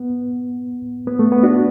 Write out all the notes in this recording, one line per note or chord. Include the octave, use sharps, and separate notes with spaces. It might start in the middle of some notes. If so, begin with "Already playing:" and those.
Already playing: B3
B3
A3
B3
D4 F#4